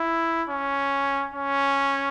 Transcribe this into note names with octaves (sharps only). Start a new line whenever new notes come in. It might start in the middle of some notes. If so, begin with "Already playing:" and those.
Already playing: E4
C#4
C#4